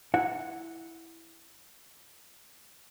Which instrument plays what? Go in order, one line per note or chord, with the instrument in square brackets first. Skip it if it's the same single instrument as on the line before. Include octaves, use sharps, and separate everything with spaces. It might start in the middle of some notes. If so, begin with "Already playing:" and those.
[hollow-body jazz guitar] E4 F#5